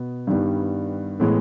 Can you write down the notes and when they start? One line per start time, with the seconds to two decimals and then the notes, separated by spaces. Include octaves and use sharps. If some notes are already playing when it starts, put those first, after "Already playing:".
Already playing: B2 B3
0.27 G2 D#3 G3 B3
1.20 A2 E3 G#3 B3